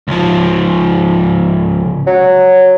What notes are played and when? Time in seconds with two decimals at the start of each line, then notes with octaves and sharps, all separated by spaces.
0.08 C#2 F3
2.07 F#3